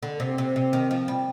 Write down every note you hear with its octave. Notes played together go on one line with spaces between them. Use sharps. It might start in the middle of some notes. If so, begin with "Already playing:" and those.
D3
C3
C3
C3
D#3
F3
G3